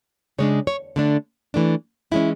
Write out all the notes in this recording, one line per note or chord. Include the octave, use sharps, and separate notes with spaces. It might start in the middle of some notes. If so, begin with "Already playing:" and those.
C#3 G#3 D4 C#5
C#5
D3 A3 D4
E3 A3 D4
E3 G#3 C#4 E4